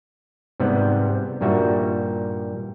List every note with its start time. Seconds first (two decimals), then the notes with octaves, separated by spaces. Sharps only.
0.60 G#2 C3 G3 B3
1.41 G2 A#2 G3 F#4 E5